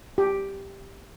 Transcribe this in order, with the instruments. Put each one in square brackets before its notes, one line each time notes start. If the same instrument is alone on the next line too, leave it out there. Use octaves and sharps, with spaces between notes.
[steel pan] G4